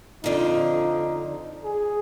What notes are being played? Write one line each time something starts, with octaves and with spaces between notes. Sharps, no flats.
F2 D3 F3 D#4
G#4